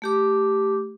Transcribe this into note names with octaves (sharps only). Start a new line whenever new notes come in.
A3 G4 D6